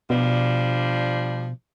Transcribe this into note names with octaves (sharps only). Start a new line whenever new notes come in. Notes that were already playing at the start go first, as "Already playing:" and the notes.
B2 F3 G3 D4